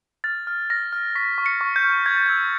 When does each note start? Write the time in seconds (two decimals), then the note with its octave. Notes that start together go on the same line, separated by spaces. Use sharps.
0.24 F6 A6
0.47 F6
0.70 F6 A#6
0.93 F6
1.15 C#6 B6
1.38 C#6
1.46 C#7
1.61 C#6
1.76 G6
1.83 F6
2.06 C#6 G#6
2.16 A6
2.26 E6 G#6